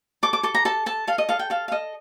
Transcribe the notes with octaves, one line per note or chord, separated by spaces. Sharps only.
A4 D6
D6
A4 D6
A#5
A4 A5
A4 A5
A4 F5
D#5
A4 F5
G5
A4 F5
F5
A4 D#5